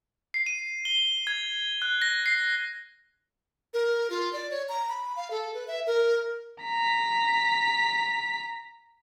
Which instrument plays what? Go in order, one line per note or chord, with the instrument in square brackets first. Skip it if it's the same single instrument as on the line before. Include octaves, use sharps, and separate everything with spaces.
[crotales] C7
D#7
G7
G#6
F#6
A#6
C7
[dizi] A#4
F4
D5
C#5
A#5
B5
F5
A4
B4
E5
A#4
[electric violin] A#5 B6